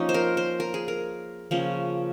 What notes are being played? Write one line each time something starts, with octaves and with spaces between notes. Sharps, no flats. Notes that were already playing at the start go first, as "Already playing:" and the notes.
Already playing: F3 A#3 C#4 D#4
C5
A#4
C5
A#4
G#4
A#4
C#3 F3 A#3 C#4